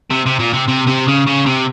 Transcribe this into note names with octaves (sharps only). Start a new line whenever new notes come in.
C3
C3
A#2
C3
C3
C3
C#3
C#3
C3